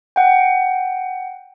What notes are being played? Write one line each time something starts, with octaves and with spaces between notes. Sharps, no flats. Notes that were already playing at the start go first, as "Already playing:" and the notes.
F#5 G5